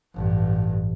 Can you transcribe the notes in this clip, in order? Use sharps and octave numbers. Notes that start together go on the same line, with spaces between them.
A1 G2